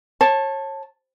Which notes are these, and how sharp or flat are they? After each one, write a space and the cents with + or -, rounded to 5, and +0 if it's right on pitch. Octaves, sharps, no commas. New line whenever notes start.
C#5 -30 A5 +0